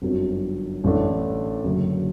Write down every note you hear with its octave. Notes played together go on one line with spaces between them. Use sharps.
G1 F#2 F#3 C4
A1 A2 E3 A3 D4
F#1 F#2 D3